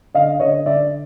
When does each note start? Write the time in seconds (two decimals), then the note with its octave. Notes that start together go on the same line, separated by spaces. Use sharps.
0.14 D3 D#5 F5
0.39 D3 C#5 D#5
0.66 D3 D5 E5